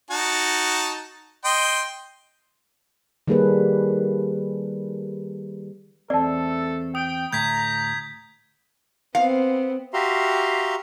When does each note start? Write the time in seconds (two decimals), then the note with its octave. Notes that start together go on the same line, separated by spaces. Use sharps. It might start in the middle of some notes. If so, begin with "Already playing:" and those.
0.11 D#4 F#4 A5
1.45 D#5 G5 C6
3.28 D#3 G3 A#3 G#4 A4 B4
6.10 E2 A3 C4 A4 D5 A5
6.95 G5 D#6
7.33 D2 A2 A#5 G6 G#6 B6
9.15 B3 C4 F5
9.94 F#4 G4 E5 F5 A#5 C6